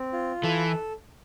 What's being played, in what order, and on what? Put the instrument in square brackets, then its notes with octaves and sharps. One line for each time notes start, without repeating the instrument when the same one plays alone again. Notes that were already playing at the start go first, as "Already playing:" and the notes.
Already playing: [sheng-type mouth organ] C4
F4
[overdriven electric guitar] E3 [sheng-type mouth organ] A4